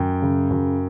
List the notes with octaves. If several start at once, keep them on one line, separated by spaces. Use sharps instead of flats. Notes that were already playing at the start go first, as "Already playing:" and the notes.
Already playing: F#2 G5
C#3
F#2